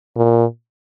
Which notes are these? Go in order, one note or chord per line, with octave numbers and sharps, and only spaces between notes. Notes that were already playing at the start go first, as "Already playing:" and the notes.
A#2